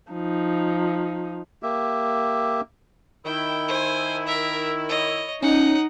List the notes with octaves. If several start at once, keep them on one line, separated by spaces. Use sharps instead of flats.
F3 D#4
A#3 G4 E5
D#3 E4 G5
C5 G#5
A#4 E5
C#5 D#5
C#4 D#4 F#5